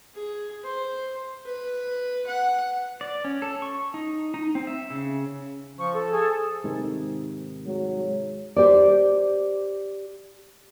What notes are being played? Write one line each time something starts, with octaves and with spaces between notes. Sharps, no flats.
G#4
C5
B4
F#5
D5
C#4
A4
C#6
D#4
D#4
C4
E5
C#3
F3 C#6
A4
G#4
G#2 C3 D#3
F#3 G#3
G4 C5 D5